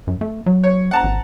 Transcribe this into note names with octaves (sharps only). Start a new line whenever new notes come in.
F#2
A3
F#3
C#5
F#5 A5 A#5
G#1